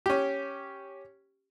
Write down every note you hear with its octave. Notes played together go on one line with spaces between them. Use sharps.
C#4 G4